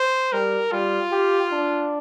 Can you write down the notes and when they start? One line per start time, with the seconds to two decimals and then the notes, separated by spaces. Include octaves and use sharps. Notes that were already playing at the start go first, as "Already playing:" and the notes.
Already playing: C5
0.32 G3 A#4
0.72 G3 F4
1.11 G4
1.52 D4